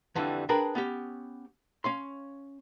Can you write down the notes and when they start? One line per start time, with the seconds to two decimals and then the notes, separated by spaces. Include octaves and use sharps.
0.15 F2 D3 E3 G3
0.49 D4 G#4 A#4 B4 G5 A5
0.75 B3 C#4 G4
1.84 C#4 F5 C6